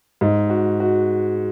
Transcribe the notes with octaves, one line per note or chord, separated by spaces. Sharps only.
G#2
F#4
F#4